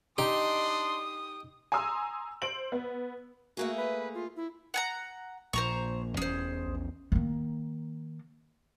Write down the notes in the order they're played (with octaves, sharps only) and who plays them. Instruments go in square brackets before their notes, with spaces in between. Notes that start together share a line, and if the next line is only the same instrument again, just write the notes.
[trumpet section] D4 C6 [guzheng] D#4 [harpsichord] G4 [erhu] D#6
[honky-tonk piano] G#5 A#5 C6 D#6 E6
C5 D7 F#7
B3
[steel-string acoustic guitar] A3 A#3 G#4 [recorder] F#4
[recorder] B4
F4
E4
[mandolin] F#5 G#5 A#5
[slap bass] A#1 A#2 [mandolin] C5 A#5 C#6
[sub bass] F1 [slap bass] E2 C#4 [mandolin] G#4 C5
[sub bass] A#1
[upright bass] D#3 A#3